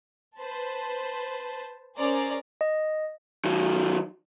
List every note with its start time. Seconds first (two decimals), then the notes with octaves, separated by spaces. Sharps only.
0.37 B4 C5 A5
1.98 C#4 G#4 A#4 C5 D5 A#5
2.61 D#5
3.45 D#3 F#3